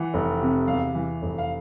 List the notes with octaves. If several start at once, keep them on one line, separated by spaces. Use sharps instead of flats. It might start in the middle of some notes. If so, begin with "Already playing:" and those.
Already playing: E3 F#5
F1
C3
E2 F5
E3
F1
F5